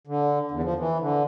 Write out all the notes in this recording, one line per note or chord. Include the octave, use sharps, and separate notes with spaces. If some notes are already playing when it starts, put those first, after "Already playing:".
D3
E2
F3
E3
D3